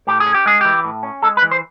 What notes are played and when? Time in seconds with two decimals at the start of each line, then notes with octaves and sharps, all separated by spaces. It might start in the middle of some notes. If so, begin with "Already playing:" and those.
0.07 A2 G4
0.20 G#4
0.26 C#4
0.34 G4
0.46 G#3 G#4
0.61 E3 G4
0.85 A2
1.03 C#4
1.22 G#3 A4
1.37 B4
1.42 E3
1.51 C5